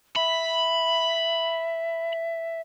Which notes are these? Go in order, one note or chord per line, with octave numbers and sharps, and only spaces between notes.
E5 B5